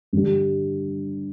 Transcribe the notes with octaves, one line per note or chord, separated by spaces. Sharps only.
G2 D3 G3